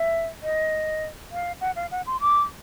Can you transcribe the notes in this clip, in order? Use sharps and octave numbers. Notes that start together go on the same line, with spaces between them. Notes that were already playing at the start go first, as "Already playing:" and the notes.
Already playing: E5
D#5
F5
F#5
F5
F#5
C6
D6